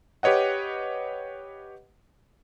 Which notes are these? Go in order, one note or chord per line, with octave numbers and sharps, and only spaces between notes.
G4 B4 C#5 D#5 F#5